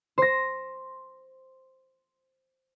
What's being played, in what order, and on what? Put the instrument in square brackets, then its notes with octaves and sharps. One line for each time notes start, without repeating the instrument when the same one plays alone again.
[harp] C5 A#6